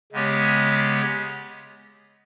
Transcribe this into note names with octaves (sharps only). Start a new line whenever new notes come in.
C#3 G#3 B3 G4 C#5